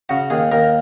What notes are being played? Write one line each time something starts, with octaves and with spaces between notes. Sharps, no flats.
C#3 F#4
D#2 G#4
D#2 A#4